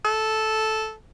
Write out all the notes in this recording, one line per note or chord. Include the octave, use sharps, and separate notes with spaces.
A4